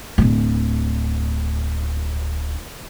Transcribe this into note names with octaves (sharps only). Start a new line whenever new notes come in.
D1 G#1